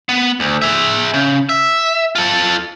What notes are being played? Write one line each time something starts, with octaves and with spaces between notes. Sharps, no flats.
B3
D2
G#4 E5
C#3
E5
F4 A4